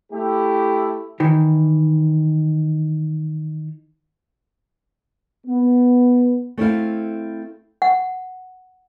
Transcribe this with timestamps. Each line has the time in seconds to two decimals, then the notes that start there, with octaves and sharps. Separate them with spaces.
0.12 A3 E4 G4
1.20 D#3 E3
5.47 B3
6.58 A3 C4 E4 F5
7.82 F#5